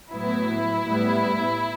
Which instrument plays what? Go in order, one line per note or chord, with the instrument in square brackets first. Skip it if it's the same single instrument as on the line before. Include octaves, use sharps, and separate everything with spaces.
[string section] A2 F#3 B3 E4
A2 G3 B3